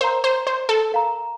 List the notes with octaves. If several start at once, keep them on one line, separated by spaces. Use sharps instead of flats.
A#4 C5 F5 A#5
C5
C5
A4
A#4 F5 A#5